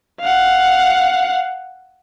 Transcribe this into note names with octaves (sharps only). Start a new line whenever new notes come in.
F5 F#5